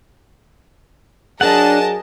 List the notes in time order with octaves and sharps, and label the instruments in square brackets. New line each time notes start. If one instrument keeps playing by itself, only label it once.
[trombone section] F#3 G#4 [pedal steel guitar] D4 F#5 [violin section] A#4 D#5 A5